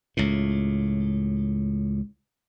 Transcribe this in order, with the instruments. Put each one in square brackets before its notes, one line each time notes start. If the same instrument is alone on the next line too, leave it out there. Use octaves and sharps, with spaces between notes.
[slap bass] C#2 A2